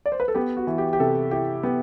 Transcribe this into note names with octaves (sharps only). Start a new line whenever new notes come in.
D5
C5
B4
A4
B3 G4
F#4
E3
G4
G4
C3 A4
E4 G4
B3 G4